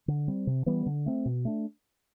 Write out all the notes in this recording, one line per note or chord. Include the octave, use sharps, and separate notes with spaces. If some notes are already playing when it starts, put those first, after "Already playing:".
D3
G3 C4
C3
E3 G3 B3
D3
A3 C4
B2
A3 D4